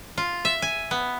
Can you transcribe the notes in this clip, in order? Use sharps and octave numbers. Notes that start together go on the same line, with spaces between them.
F4
E5
G#5
B3